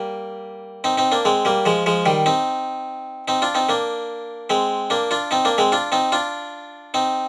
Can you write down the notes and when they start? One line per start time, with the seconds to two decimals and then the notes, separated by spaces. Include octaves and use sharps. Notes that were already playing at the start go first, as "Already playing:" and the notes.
Already playing: G3 A#3
0.84 C4 D#4
0.97 C4 D#4
1.12 A#3 D4
1.25 G#3 C4
1.45 G3 A#3
1.66 F3 G#3
1.86 F3 G#3
2.06 D#3 G3
2.26 C4 D#4
3.28 C4 D#4
3.42 D4 F4
3.55 C4 D#4
3.69 A#3 D4
4.50 G#3 C4
4.90 A#3 D4
5.11 D4 F4
5.31 C4 D#4
5.45 A#3 D4
5.58 G#3 C4
5.72 D4 F4
5.92 C4 D#4
6.12 D4 F4
6.94 C4 D#4